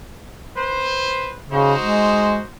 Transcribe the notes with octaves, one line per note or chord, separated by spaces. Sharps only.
B4 C5
C#3 D#4 F#4 C5
G#3